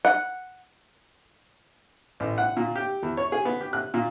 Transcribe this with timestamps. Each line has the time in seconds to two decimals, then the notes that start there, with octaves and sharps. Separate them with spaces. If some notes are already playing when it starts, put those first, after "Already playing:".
0.05 F#5
2.20 A1
2.38 F#5
2.57 A#2
2.75 G4
3.03 E2
3.17 C#5
3.32 G#4
3.45 B3
3.61 G4
3.73 F#6
3.94 A#2